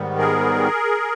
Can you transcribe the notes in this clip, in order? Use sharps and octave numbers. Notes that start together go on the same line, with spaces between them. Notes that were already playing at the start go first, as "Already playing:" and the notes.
Already playing: G#2 D#3 G3 B3
G#4 A#4